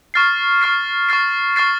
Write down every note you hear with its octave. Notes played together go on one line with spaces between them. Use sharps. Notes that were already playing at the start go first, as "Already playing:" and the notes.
C#6 F6 A6 C7
C#6 F6 A6 C7
C#6 F6 A6 C7
C#6 F6 A6 C7